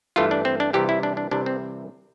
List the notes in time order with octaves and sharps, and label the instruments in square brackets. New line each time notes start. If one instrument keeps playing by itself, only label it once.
[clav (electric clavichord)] G2 E3 A3 F4
D4
C4
D4
C2 C3 E3 G3 G4
E4
D4
D4
C2 C3 E3 G3 D4
C4